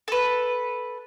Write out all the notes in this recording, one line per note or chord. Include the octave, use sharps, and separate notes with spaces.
A4 B4